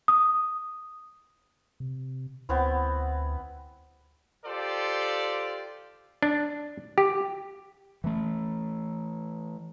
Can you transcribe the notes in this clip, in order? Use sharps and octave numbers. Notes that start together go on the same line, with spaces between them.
D#6
C3
D2 B3 C4 E4
F4 G4 A4 C5 D5
D4
G4
E3 A3